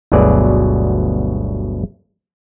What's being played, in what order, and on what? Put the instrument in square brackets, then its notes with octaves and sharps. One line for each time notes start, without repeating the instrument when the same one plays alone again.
[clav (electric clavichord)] G1 D2 B2 F#3 G#4 D5